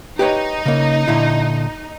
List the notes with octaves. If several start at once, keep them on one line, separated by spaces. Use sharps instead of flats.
D#4 G4 B4 C#5
C#3 A#3
A#2 D3 E4